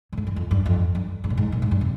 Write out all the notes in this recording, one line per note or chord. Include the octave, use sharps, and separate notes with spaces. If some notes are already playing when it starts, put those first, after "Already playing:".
A#2
G#2
G2
F2
G2
F2
G2
G#2
A#2
G#2
A#2
G#2
G2
C3